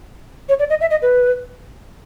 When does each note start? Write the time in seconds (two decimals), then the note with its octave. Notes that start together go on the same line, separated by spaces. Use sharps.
0.49 C#5
0.59 D5
0.70 D#5
0.81 E5
0.91 D#5
1.02 B4